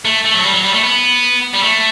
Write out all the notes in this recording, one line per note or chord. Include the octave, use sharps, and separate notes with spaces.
A3
A3
F#3
G3
F#3
G3
A3
B3
G3
A3